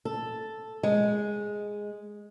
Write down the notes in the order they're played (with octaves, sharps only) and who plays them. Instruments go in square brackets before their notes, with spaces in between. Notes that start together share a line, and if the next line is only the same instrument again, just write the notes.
[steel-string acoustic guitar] A4
G#3